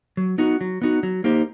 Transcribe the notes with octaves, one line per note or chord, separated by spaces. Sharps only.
F#3
B3 D#4 F#4
F#3
B3 D#4 F#4
F#3
A#3 D#4 G4 C5